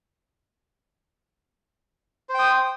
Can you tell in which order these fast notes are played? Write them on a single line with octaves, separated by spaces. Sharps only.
C5 G5 D#6